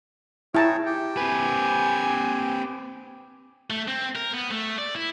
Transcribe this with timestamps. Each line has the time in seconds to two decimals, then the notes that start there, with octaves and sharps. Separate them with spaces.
0.55 E4 G#4 C#5 G5 A5 A#5
0.86 G4 G5
1.17 C4 B4 G#5
3.70 A3
3.88 C4
4.16 A#4
4.34 B3
4.51 A3
4.78 D5
4.96 E4